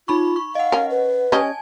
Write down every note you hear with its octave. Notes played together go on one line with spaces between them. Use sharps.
D#4 F4 B5 C#6
C#6
D#5 F5 F#5
C#4 A#4
B4
C#4 G4 D#5 G#5 A5 G#6